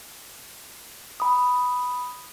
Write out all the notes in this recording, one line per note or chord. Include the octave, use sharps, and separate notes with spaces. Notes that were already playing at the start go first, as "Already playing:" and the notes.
B5 D#6